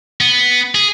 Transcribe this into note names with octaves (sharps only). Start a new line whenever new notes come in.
B3
G#4